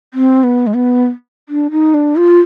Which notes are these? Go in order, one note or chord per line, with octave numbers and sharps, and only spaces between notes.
C4
B3
G#3
B3
D4
D#4
D4
F4